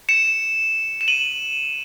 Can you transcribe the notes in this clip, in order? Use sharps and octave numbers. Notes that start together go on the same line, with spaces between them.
C#7 E7
E7
D#7 F#7